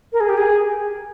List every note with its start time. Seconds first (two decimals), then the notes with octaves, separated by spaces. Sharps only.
0.13 A#4
0.20 G#4
0.29 G4
0.37 G#4